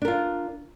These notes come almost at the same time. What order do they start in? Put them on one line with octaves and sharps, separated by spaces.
D4 A#4 F4